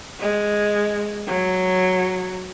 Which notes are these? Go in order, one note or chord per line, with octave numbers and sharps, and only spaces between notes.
G#3
F#3